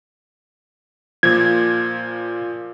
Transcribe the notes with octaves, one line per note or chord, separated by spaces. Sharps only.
A#2 F3 G#6